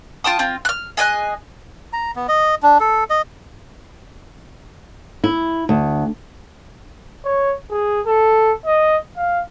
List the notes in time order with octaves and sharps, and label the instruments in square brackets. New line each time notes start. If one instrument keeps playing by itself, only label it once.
[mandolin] F4 G5 A5 D#6
C4 F4
F6 F#6
G#4 D#5 G#5 F#6
[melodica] A#5
B3
D#5
D4
A4
D#5
[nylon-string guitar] E4
D2
[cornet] C#5
G#4
A4
D#5
F5